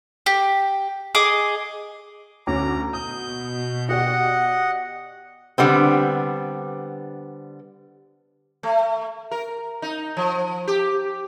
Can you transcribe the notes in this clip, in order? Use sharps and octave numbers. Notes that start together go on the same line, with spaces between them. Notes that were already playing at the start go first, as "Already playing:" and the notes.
G4
G#4 D#5 D6
D2 C#4 A#5 D6
B2 D#6 G6
F#4 G4 D5 D#5 F#5
D3 G3 B3 C4
A3
A#4
D#4
F3
G4